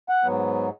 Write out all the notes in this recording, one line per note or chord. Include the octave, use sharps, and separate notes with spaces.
F#5
G#2 F#3 B3